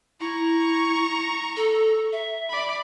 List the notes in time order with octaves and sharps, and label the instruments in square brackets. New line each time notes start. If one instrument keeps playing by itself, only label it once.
[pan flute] E4 [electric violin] A#5 C#6
[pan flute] A4
E5
[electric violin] D5 B5